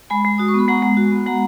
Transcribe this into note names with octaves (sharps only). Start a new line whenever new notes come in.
G#3 G#5 B5
G#3
F#4 D#6
C#6
B3 B5
G#3 F#5 A#5
G#3
F#4
B3
G#3 F#5 A#5